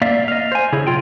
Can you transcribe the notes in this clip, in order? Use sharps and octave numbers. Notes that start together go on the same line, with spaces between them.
A#3 D5 E5 F5
D#5 F5
C5 G#5
C#3 E4 G#4 C#5
B1 F4 G5